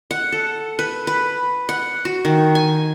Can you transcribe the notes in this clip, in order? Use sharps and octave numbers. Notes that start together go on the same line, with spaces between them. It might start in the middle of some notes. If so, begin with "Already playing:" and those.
F#5
A4
B4
B4
F#5
F#4
D#3
G#5